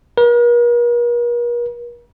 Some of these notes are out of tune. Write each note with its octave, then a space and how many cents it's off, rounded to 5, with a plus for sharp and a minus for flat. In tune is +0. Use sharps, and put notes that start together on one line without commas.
A#4 +45